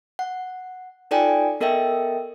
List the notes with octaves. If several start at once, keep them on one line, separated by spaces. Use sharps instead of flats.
F#5
D#4 F4 A4 D5 G5 G#5
B3 A4 A#4 D#5 E5 G5